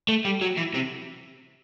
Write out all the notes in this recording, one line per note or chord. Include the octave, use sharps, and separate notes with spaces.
A3
G3
F#3
E3
C3